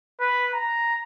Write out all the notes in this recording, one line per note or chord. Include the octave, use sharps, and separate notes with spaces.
B4
A#5